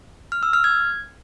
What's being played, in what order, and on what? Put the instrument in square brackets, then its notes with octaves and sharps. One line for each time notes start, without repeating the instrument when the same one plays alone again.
[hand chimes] F6
E6
F6
G#6